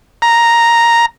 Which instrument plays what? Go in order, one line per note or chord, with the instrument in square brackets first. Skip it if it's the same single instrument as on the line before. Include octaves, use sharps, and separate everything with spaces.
[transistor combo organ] A#5